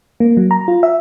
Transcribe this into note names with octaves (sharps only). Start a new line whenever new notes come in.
A#3
F#3
A#5
F4
E5